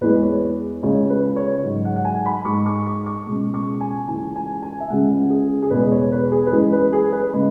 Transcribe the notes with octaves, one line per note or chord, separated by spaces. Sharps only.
E2 E3 G#3 B4
C#5
C#2 C#3 G#3 C#5
B4
C#5
G#2 F#3
F#5
F#5
G#5
B5
G#2 G#3 C#6
C#6
C#6
C#6
C#2 B2 G#3
C#6
G#5
C#2 C#3 E3 G#5
G#5
G#5
E5
C#2 C#3 G#3 F#5
G#4
G#4
E2 B2 G#3 B4
C#5
B4
G#4
B4
F#2 E3 G#3 G#4
B4
G#4
B4
C#3 G#3